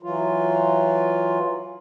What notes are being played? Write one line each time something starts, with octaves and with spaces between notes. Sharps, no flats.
E3 F#3 F4